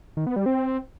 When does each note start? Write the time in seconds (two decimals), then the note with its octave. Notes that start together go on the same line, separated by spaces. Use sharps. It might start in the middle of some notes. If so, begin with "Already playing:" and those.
0.17 D#3
0.27 B3
0.36 G3
0.46 C4